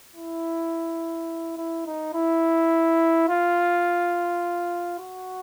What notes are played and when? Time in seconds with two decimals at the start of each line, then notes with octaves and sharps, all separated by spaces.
0.15 E4
1.57 E4
1.86 D#4
2.14 E4
3.29 F4
4.99 F#4